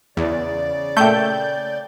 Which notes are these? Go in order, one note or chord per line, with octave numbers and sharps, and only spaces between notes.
E2 C#3 D5
A#2 A3 A4 G5 G6